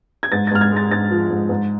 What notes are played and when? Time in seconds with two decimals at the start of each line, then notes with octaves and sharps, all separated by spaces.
0.23 G#6
0.32 G#2 A6
0.47 A6
0.51 G#2 F6
0.61 G#6
0.72 G#3 A6
0.91 G#2 A6
1.11 F3
1.30 G#2
1.49 G#2